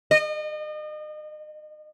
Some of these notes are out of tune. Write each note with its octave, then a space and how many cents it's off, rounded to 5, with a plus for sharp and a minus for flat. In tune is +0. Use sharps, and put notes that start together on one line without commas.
D#5 -35